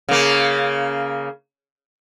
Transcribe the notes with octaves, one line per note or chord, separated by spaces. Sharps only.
C#3 A#3